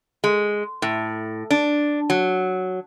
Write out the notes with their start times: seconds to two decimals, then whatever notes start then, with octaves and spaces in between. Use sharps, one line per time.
0.24 G#3
0.82 A2
1.50 D4
2.10 F#3